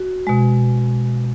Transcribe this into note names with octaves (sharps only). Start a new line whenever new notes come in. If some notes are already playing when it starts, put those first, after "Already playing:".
Already playing: F#4
B2 G#3